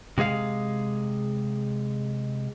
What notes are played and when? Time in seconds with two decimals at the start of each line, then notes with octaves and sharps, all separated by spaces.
0.18 C3 G#3 G#4 F5